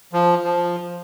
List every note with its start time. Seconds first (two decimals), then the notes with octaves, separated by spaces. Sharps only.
0.13 F3
0.44 F3